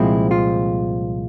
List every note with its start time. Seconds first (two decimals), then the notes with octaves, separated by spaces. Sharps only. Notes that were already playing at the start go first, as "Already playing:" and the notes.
Already playing: C2 A#2 F3 G#3 C4 E4
0.31 F4